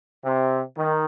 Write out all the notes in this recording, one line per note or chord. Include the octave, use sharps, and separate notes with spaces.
C3
D#3